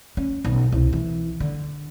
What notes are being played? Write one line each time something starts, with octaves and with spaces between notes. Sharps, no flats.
C#4
B1
C2
E3
D3